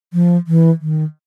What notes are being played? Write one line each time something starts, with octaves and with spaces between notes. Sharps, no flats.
F3
E3
D#3